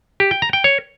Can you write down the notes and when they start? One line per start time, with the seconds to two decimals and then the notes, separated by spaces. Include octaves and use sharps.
0.20 G4
0.31 G5
0.42 A#5
0.53 G5
0.64 C#5